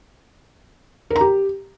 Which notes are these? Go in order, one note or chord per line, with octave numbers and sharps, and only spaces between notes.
A#4
A#5
G4